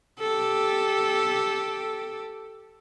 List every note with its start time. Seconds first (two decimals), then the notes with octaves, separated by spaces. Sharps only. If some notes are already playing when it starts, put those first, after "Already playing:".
0.20 G4 A4